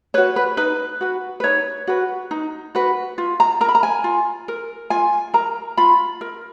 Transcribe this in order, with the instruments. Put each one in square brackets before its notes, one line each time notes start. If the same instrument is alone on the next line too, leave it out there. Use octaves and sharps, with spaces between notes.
[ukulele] F#4 B4 C#5
B4
D#4 B4
F#4 B4
B4
D#4 C#5
F#4 B4
D#4
F#4 B4
F4
A#5
A#4 A#5
B5
A#5
G#5
F4
A#4
F4 G#5
A#4 A#5
F4 B5
A#4